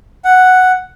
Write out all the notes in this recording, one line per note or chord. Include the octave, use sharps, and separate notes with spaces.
F#5